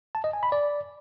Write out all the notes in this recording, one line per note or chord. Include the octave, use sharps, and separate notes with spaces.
A5
D#5
G#5
B5
D5